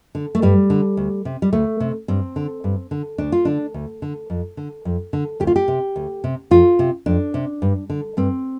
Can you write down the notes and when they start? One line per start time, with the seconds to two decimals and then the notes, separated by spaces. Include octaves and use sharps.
0.15 D3
0.35 A3
0.42 G2 G3
0.70 D3
0.97 D2
1.25 C3
1.42 G3
1.53 D2 A3
1.80 C3
2.08 G2 C4
2.36 D3
2.64 G2
2.91 D3
3.18 D2 D4
3.32 F4
3.45 D3 D4
3.74 D2
4.02 D3
4.30 F2
4.57 D3
4.85 F2
5.13 D3
5.40 D2 G4
5.47 F4
5.56 G4
5.68 C3
5.96 D2
6.24 C3
6.51 F2 F4
6.79 C3
7.06 F2 D4
7.34 C3
7.62 G2
7.90 D3
8.17 G2 C4